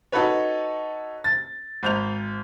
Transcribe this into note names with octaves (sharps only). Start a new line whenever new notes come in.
D#4 F#4 A4 B4 C#5
A6
G#1 G6 F7